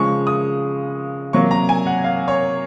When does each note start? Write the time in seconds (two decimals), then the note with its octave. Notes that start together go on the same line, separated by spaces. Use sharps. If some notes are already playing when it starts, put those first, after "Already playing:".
Already playing: C#3 F3 G#3 C#6
0.27 D#6
1.33 C3 F#3 A#3 C#6
1.51 A#5
1.69 G#5
1.87 F#5
2.04 F5
2.28 C#5